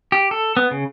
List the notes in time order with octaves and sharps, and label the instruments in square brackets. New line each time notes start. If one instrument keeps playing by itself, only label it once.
[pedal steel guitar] G4
A4
B3
C#3